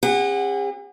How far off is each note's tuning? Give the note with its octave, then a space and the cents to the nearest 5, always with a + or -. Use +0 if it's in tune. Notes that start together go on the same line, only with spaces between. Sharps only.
C#4 -45 G#4 -45 F#5 +0